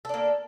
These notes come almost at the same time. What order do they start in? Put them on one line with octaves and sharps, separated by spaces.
A4 D4 A#3